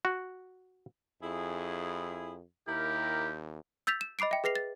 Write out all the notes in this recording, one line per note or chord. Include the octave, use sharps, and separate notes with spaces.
F#4
F2 E4 G#4
D#2 E4 G4 A#4
E6 G6 A6 B6 F7
E7
D#5 B5 D6 C7 D7
E5 G5
G#4 B4 A#6 C7 F7
A6